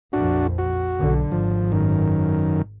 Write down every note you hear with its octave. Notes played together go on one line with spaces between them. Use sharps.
A#1 F2 D4 F#4
F#4
B1 D3
G#1 F3
F#2 D#3